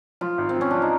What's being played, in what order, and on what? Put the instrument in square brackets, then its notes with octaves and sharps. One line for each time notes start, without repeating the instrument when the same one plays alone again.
[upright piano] F3 [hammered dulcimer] F4
[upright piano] G#1
[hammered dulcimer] C4
[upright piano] F3 [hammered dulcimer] C#4
[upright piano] F3 [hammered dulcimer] D4
[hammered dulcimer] D#4